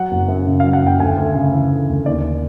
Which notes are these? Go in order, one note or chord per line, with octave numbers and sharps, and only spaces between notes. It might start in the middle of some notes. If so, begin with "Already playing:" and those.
Already playing: F#3 F#5
F#1
F#2
C#3
F#3 F5
F#5
F#1 G5
D2 G#5
D2
C#3
E3
D2
D2
D#2 D5